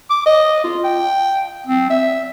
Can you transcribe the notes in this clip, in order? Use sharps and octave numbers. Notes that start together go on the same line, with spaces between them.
D6
D#5
F4
G5
C4
E5